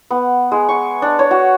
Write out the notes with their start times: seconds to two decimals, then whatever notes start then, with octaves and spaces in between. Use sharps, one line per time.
0.10 B3
0.52 G#3
0.69 C#6
1.02 D4
1.19 C#5
1.31 F#4